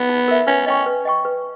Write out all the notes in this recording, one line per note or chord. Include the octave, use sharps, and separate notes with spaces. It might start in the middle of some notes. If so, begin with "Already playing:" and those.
Already playing: B3
D#4
A#4 E5
C#4 B4
C#4 D#5 G5 C#6
B4
D#5 G5 C#6
B4